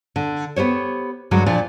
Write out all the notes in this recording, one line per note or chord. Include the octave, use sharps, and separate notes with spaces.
D3
B3 G4 C5 C#5
G2 D3 F#3 G#3
A#2 F3 D4